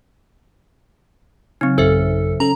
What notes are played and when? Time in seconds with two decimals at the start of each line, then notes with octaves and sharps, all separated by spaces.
1.61 C#3 F#3 C4 D#4
1.78 A1 F#2 D#4 A4 C5 E5
2.40 C#4 A4 A#5